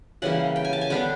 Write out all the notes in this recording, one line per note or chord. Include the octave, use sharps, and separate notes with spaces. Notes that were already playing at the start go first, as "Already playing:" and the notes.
C#3 E3 G3 A#3 F#5
G5
G#5
A5
G#5
D3 G3 B3 D4 G5